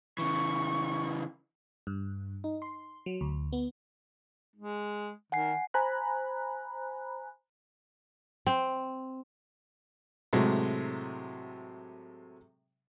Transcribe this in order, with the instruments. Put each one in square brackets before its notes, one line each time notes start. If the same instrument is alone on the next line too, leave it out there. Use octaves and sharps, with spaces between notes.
[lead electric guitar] C#3 E3 [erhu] C#6
[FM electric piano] G2
D#4
C6
F#3
D2
B3
[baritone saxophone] G#3
[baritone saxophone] D#3 [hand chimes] F#5 G#5 C7
[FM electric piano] C5 G#5 A#5 B5 F#6
[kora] C4
[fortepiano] A2 C3 F#3 G#3